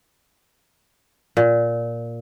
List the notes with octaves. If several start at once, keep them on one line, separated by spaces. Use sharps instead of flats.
A#2